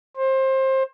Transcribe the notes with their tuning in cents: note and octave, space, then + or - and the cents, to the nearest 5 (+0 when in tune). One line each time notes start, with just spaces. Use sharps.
C5 +25